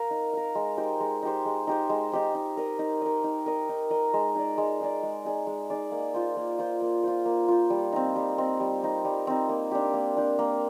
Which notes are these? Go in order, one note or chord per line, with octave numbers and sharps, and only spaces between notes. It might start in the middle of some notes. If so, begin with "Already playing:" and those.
Already playing: A#4 F5
D#4
A#4 F5
G#3
D#4 G4 C5
G#3
D#4 G4 C5
G#3
D#4 G4 C5
G#3
D#4 G4 C5
D#4
A#4 D#5
D#4
A#4 D#5
D#4
A#4 D#5
D#4
A#4 D#5
G#3
D#4 G#4 D5
G#3
D#4 G#4 D5
G#3
D#4 G#4 D5
G#3
D#4 G#4 D5
A#3
F4 C5
A#3
F4 C5
A#3
F4 C5
A#3
F4 C5
G3
C4 D#4
G3
C4 D#4
G3
C4 D#4
G3
C4 D#4
A#3
D4 G4
A#3
D4 G4
A#3